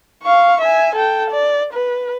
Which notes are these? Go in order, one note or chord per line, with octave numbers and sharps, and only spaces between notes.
F5 C#6
E5 G#5
A4 G5
D5
B4